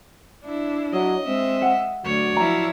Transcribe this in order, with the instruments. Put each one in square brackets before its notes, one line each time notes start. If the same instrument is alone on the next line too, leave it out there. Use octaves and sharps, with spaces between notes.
[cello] D4 E4
[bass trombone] F#3 [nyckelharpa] D#5
[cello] G#3 E5 [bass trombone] C4
[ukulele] F#5
[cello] D2 [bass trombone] F#3 [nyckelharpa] C#5 D5
[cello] F3 E4 [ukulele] A#5